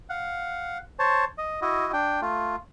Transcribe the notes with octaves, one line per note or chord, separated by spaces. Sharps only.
F5 F#5
C5 C#5 A5
D#5
E4 F#4 D#5
D4 G5
A3 F4